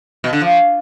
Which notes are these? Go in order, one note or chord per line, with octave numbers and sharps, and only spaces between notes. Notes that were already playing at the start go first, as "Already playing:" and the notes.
B2
D3
F3